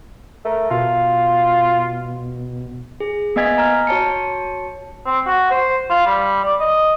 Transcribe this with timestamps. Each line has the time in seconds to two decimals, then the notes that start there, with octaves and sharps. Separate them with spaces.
0.45 A3 A#4
0.71 B2 F4
3.00 G#4
3.36 A#3 B3 D#5 G#5 G#6 B6
3.58 A#5 F6
3.87 F#4 C#5 A5 C#7
5.06 C4
5.27 F#4
5.51 C5
5.90 F4
6.06 G3
6.44 D5
6.60 D#5